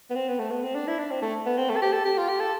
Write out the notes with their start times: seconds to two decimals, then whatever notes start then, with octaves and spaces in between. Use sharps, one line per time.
0.10 B3
0.16 C4
0.28 B3
0.39 A3
0.51 B3
0.63 C4
0.75 D4
0.88 E4
0.98 D4
1.11 C4
1.22 A3
1.46 B3
1.57 C4
1.69 A3
1.76 A4
1.82 G4
1.93 A4
2.05 G4
2.18 F4
2.29 G4
2.40 A4